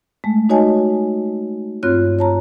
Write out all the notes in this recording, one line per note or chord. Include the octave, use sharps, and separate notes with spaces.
G#3 A3
D#4 F#4 C#5 D#5 G#5 A5
G2 C4 F4 C#5 F#6
C#5 A5 A#5